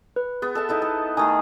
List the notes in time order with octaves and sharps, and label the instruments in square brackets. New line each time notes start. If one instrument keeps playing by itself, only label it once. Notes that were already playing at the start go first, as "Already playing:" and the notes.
[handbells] B4
[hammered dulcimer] B3 [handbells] G#4
[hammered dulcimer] A4 E5 A5
D#4 E4 A4
A4
[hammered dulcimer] D#3 A3 G#4 [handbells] G#5 A#5 D#6